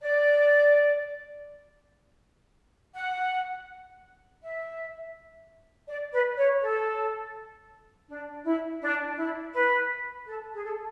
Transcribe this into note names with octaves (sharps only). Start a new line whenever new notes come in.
D5
F#5
E5
D5
B4
C#5
A4
D4
E4
D4
E4
B4
A4
G#4
A4